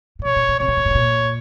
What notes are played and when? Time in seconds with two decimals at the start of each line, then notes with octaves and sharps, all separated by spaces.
0.19 A#2
0.24 B2 C#5
0.36 A#2
0.48 A#2
0.60 C3 C#5
0.68 B2
0.77 A#2
0.86 A2
0.90 B2
0.95 A#2